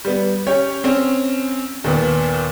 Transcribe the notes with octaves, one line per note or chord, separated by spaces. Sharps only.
G3 B3
C#4 G4 C#5
C4 C#4
D#2 A#2 B3